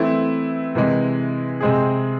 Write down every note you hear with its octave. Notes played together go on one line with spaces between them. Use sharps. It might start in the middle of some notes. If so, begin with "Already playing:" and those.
Already playing: E3 A3 C4 E4
C3 E3 G#3
C3 G#3 C4 G#4